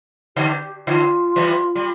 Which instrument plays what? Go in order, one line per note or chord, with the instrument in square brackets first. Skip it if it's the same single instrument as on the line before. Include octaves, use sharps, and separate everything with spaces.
[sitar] D3 [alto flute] G4
[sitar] D3 [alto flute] F4
[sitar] E3 G3
G3